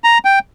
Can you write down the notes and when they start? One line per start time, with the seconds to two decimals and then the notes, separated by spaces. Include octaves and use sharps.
0.04 A#5
0.25 G5